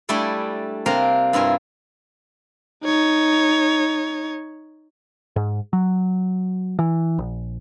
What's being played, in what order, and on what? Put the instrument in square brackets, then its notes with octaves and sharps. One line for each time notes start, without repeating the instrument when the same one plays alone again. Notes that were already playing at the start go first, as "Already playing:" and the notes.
[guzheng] G3 A3 D4 E4 D5 G#5
C3 A#3 C4 D4 A#4 A#5
G2 E4 F4 A#4 G#5
[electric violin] D#4 C#5
[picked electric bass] G#2
F#3
E3
A#1